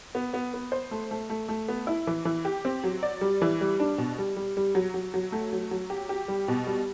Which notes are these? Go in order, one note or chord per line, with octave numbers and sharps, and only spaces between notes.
B3
B3
B3
C5
A3
A3
A3
A3
B3
E4
E3
E3
G4
C4
F#3
D5
G3
E3
G3
D4
B2
G3
G3
G3
F#3
F#3
F#3
A3
F#3
F#3
G4
G4
G3
B2
G3